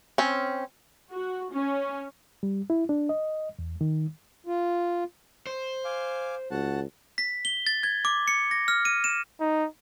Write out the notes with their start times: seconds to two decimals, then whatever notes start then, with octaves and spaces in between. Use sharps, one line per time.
0.18 C4 C#4
1.12 F#4
1.53 C#4
2.43 G3
2.70 E4
2.89 D4
3.09 D#5
3.59 E2
3.81 D#3
4.46 F4
5.47 C5
5.85 F5 G#5 D6
6.51 C#2 F#4 F#5 A5
7.18 B6
7.45 G7
7.67 A6
7.83 G#6
8.05 D6
8.28 C#7
8.51 A#6
8.68 F6
8.85 D#7
9.04 E7
9.40 D#4